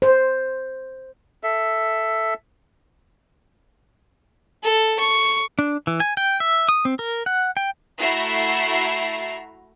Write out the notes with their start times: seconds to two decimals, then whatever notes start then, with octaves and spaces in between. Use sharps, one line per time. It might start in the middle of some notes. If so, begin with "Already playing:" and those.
0.02 C5
1.43 A4 E5
4.63 A4
4.99 C#6
5.59 D4
5.87 E3
6.00 G#5
6.17 G5
6.40 E5
6.69 D#6
6.85 C4
6.99 A#4
7.26 F#5
7.57 G5
8.00 A3 E4 F#4 E5 A#5 C7